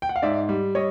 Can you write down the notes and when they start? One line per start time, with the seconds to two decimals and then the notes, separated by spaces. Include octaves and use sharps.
0.02 G5
0.09 F#5
0.16 F5
0.22 G#2 D5 E5
0.49 G3
0.75 G3 C#5 D#5